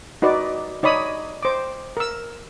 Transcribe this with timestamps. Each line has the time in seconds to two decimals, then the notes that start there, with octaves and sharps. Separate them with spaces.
0.22 D#4 F#4 B4 D5
0.83 D#4 C#5 D5 B5 D#6
1.43 C5 D6
1.97 A#4 E6